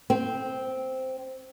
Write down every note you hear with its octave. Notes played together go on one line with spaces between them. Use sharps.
C4